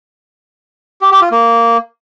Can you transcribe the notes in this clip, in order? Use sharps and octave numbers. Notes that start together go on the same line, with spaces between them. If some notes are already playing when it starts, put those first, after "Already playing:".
G4
G4
F4
A#3